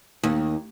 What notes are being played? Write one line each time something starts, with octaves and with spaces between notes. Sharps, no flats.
D#2